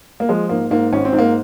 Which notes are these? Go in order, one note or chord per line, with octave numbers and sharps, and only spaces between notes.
A#3
F3 G#3
G#2 A#3
G#2 A#3
G#1 C#4
C4
G#2
A#3